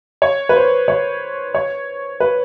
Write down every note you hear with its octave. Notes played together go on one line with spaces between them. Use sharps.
C#5
B4
C5
C#5
C#5
B4